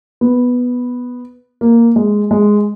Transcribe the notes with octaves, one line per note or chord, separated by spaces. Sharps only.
B3
A#3
G#3
G#3